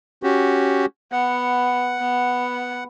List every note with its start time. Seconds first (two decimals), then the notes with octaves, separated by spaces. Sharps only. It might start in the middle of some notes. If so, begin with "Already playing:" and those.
0.23 C#4 F#4 G4
1.12 B3 F#5
1.99 B3